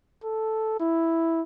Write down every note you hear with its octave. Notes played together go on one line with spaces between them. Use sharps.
A4
E4